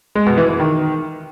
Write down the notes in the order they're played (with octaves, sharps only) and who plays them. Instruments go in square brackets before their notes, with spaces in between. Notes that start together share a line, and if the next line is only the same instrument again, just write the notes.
[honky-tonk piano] G#3
B2
E3
E3
D#3